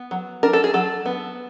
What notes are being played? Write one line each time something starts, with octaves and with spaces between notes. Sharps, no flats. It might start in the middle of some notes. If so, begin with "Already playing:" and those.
Already playing: B3
F#3
D4 A#4
A4
G#4
F#3 A4
B3